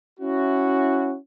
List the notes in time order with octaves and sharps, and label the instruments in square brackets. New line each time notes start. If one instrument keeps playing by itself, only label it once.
[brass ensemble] C#4 E4 F#4